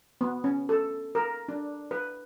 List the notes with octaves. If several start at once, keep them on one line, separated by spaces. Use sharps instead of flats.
B3
C#4
A4
A#4
D4
B4